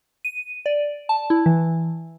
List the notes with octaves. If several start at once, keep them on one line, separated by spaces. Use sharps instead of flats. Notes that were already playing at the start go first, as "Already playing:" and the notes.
D#7
D5
A5
E4
E3